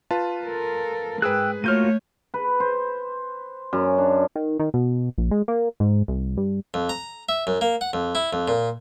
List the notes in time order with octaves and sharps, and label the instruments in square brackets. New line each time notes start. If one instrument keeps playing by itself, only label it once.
[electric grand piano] F4 B4 A5
[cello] A4 A#4
[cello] G#2 [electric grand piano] G#4 B4 [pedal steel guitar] G5 E6 F#6
[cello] A3 C#5 [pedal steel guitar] A#3 F4 F#4 [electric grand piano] F6 G6 D#7
[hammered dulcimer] B4
C5
F#2
D4
[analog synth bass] D#3
D#3
B2
A#1
G#3
A#3
G#2
C2
G2
[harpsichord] F2
A#5
E5
F#2
A#3
F#5
F2
E4
F2
A#2